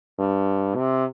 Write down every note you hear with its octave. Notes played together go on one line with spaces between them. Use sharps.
G2
C3